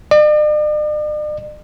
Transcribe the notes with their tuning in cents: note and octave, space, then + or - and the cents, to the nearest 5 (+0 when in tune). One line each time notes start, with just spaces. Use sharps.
D5 +45